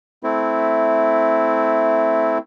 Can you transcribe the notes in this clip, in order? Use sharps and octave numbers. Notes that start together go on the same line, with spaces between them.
A3 C4 E4